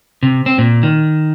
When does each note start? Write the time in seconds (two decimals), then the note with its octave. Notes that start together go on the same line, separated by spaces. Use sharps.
0.23 C3
0.46 C4
0.58 A#2
0.83 D#3